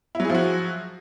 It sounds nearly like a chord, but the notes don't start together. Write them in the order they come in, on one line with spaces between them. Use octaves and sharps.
E4 F#3 G#4 F3 F#4